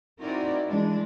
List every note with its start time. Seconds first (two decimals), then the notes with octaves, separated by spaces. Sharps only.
0.20 C4 D#4 E4 F#4 A#4 D5
0.68 E3 G#3 D4